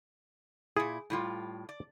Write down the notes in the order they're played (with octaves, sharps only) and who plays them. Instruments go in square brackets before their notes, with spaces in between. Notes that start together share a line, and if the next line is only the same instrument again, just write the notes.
[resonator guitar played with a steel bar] A#2 E4 [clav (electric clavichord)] G#4
[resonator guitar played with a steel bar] A2 G3 F4
D5